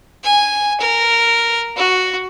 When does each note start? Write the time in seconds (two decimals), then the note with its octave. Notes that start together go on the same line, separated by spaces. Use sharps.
0.24 G#5
0.80 A#4
1.76 F#4